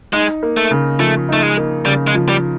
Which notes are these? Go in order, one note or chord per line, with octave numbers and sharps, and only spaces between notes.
G#3 D#4
A#3
A3
C#3
F3 A3
A3 D#4
G#3
A#3
C#3 G3
G#3
F3
G3